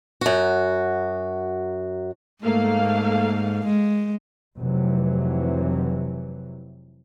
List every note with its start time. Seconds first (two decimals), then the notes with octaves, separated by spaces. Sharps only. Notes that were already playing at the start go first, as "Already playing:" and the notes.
0.21 F#2 F#4
2.44 G#2 A3 A#3 F5
3.66 G#3
4.58 F1 C3 E3 F#3